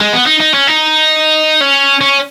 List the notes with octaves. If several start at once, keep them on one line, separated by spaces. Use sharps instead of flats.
G#3
B3
D#4
D#4
C#4
D#4
C#4
C#4